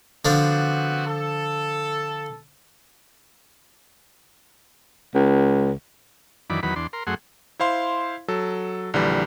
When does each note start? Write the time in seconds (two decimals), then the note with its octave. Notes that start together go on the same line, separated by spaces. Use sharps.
0.25 D3 F3 B3 C4 D4 F#4
1.06 A4
5.15 C#2
6.50 F#2 D#3 E3 D5 B5
6.63 E2 D#3 F#3 B4 B5
6.76 E2 D4 C6
6.93 A#4 C6
7.07 F#2 A3 G#4 F#5 C6
7.60 E4 C5 F5 C6
8.28 F#3 A4
8.94 A#1 D3 E3 G3